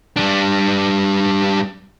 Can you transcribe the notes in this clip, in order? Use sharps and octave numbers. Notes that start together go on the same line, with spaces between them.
G3 D4